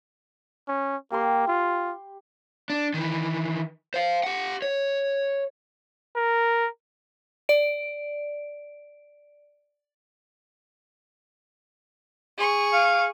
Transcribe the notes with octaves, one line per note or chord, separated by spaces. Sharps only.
C#4
A#3 G4 C6
F4
D4
D#3 E3
C5 F5
G4 F#5
C#5
A#4
D5 D7
G#4 C#6
F5